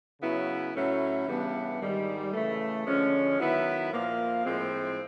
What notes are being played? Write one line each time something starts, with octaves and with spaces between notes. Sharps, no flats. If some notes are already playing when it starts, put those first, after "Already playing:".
C#3 F#3 B3 E4
A2 F#3 A3 C#4 E4
C#3 E3 G3 B3 D4
G#2 D#3 G3
C#3 E3 A3
D3 F3 G#3 C#4
D#3 F#3 B3 E4
A#2 F3 A#3
A2 F3 G#3 C4